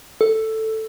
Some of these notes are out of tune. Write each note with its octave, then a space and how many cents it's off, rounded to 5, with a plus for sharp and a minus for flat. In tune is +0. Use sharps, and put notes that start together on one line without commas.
A4 +5